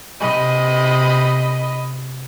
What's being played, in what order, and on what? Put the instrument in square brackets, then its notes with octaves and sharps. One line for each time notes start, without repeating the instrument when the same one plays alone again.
[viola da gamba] C3 [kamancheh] D#5 B5